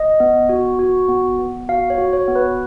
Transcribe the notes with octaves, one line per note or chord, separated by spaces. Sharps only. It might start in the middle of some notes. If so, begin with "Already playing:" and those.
Already playing: D#5
B3
F#4
F#4
B3
B3
F#4 F5
C#5
F#4
C#5
B3
B4